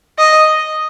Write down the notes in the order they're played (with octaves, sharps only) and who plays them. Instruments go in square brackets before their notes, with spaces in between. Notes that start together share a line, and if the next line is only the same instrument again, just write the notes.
[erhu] D#5